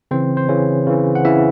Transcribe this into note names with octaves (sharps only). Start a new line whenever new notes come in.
C#3 E3 C4 C5
C5
C#3 E3 C#4 C#5
C#3 E3
F#5
C#3 E3 E4 E5